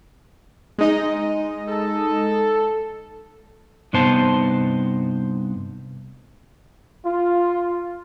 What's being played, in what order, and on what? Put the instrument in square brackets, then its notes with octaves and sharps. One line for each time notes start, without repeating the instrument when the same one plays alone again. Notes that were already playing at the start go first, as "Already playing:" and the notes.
[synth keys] G#3 D#4 D#5
[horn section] A4
[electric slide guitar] G2 C3 B3 D#4 C5 A5
[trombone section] F4